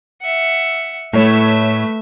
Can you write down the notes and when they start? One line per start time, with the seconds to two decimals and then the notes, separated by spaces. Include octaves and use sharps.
0.22 E5 F#5
1.13 A2 A3 B4 C#5 E5 E7